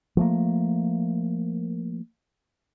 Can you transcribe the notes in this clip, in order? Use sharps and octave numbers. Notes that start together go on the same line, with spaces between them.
F3 A3 A#3